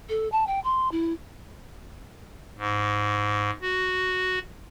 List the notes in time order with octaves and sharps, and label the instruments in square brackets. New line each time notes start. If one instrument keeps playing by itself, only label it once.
[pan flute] A4
A5
G5
C6
E4
[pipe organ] G#2
F#4